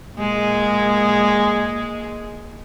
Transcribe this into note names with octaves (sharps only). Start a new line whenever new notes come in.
A#2 G#3